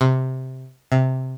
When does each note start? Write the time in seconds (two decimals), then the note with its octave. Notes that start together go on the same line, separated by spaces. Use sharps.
0.01 C3
0.92 C3